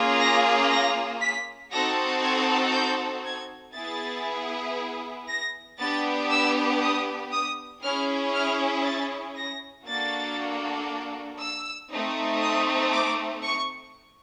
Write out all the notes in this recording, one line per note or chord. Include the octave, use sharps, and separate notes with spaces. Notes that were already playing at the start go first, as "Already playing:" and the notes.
Already playing: A#3 C#4 F4 G#4
A#6
A#6
B6
C4 D#4 F#4 A4 A#6
G#6
G6
G#6
B3 E4 G#4 A6
A#6
B3 D4 G4 A6
E6
D#6
D#6
C#4 E4 G#4 F6
F6
A6
A#6
A#3 D4 F#4 A4 A6
E6
A3 C4 D#4
D#6
D6
C#6